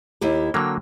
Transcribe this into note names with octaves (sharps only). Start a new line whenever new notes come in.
D#2 E4 G4
D3 F#3 A#3 G5